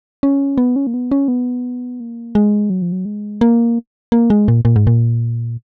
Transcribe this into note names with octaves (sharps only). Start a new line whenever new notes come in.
C#4
B3
C#4
A#3
B3
C#4
B3
A#3
G#3
F#3
F3
F#3
G#3
A#3
A#3
G#3
A#2
A#2
G#2
A#2